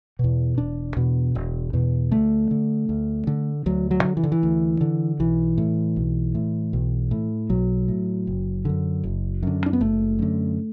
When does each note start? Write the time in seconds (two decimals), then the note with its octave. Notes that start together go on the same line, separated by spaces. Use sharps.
0.19 E2 B2
0.58 E1 D4
0.96 E2 B2
1.35 E1
1.73 E2 B2
2.11 D2 A3
2.51 D3
2.89 D2
3.27 D3
3.66 D2 F#3
3.91 F#3
4.04 D3
4.17 E3
4.23 D3
4.32 E3
4.43 D2
4.81 D3
5.19 B1 E3
5.58 A2
5.96 B1
6.35 A2
6.73 B1
7.11 A2
7.50 B1 F#3
7.88 A2
8.27 F#1
8.65 F#2 D3
9.03 F#1
9.43 F#2 D3
9.66 D4
9.73 B3
9.81 F#1 A3
10.19 F#2 D3